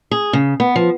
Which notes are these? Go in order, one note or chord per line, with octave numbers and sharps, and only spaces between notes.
G#4
C#3
B3
F3